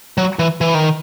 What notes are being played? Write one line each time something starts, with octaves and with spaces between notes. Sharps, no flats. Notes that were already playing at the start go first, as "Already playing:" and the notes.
F#3
E3
E3
D#3